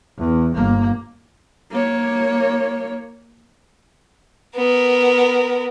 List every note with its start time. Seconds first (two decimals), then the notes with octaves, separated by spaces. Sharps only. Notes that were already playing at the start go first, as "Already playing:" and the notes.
0.18 E2
0.55 G1 A#3
1.71 A#3 C#5
4.56 B3 A#4